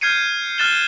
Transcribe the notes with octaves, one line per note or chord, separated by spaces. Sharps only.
F6 G6 G#6 C7 C#7 D#7
F6 F#6 A6 E7 G7